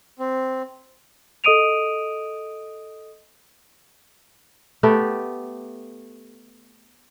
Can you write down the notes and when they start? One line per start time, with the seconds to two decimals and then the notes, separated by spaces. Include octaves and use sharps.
0.19 C4
1.44 A4 D#5 D#6 D7 D#7 F7
4.83 A3 B3 G4 A4